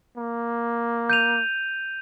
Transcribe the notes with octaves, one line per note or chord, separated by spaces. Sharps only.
A#3
G6 D#7 F7